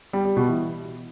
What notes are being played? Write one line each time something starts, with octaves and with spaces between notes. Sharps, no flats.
G3
G3
B2
E3